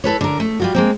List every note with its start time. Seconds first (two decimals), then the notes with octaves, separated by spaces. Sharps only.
0.04 E4 A4 B4 C#5
0.21 D3 A#4
0.40 A3
0.60 G3 F4 F#4
0.75 G#3 A#3 C4